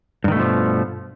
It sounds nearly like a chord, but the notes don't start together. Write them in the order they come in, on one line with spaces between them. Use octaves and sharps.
G2 D#3 A3 B2 F3